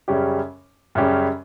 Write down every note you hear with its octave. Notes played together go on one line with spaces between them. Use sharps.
F#2 C#3 G3 C#4 G4
F#2 C#3 G3 C#4 G4